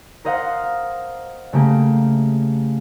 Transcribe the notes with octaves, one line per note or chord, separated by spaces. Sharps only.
A#4 C5 D#5 F5 F#5
C#3 A3 A#3 G4